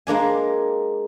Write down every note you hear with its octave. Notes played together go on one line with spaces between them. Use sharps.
G#3 A#3 D4 G#5